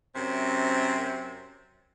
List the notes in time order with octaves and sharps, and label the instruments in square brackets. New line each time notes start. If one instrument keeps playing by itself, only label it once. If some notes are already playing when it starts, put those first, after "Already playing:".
[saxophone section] F#2 C3 C4